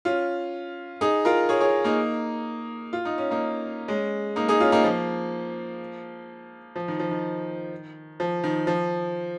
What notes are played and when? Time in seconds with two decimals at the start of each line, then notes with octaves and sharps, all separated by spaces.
0.05 C#4 F4
1.01 D#4 G#4
1.25 F4 A#4
1.49 G#4 C#5
1.61 G#4 C#5
1.84 A#3 D#4
2.93 F4
3.05 D#4
3.18 C#4
3.31 A#3 D#4
3.88 G#3 C#4
4.36 A#3 D#4
4.48 D#4 G#4
4.60 C#4 F4
4.72 A#3 D#4
4.84 F3 A#3
6.76 F3
6.88 D#3
7.00 F3
7.11 D#3
8.20 F3
8.44 D#3
8.67 F3